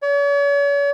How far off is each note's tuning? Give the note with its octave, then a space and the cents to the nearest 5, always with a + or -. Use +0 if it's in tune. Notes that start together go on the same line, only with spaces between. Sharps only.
C#5 +45